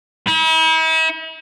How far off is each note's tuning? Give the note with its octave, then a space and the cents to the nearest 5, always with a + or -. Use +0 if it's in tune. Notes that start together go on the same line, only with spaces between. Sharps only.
E4 -45